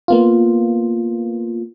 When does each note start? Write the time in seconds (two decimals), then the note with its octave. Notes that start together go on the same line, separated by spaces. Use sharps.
0.08 A#3 B3 F4